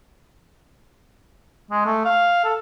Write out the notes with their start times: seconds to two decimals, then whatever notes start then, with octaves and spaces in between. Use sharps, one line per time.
1.71 G#3
1.86 A3
2.05 F5
2.44 A4